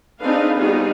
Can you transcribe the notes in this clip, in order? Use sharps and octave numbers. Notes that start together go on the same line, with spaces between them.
C4 D4 D#4 G#4 B4 F5
G3 B3 D#4 F4 F#4 G#4